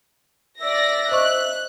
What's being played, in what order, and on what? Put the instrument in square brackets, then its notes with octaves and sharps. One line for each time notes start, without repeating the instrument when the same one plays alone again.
[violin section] D5 A#6 [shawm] E5
[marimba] C5 D#5 C#6 [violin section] F#6